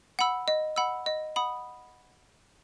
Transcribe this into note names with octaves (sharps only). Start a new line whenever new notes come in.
F#5 B5 E6
D#5
F#5 B5 E6
D#5
F#5 B5 D#6